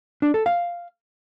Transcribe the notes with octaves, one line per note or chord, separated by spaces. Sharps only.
D4
A4
F5